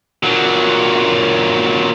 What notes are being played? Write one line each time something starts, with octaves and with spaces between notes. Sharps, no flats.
A#2 F#3